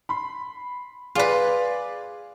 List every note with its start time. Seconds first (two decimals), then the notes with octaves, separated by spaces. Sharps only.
0.09 B5 C6
1.15 F4 G#4 B4 D5